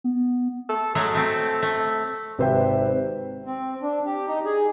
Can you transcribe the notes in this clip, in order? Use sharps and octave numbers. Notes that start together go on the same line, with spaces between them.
B3
A4
F#3 G#3 A3 A4
A3 C4
A3
G#1 C3 B4 C5 E5 G5
C4
D4
G4
D#4
G#4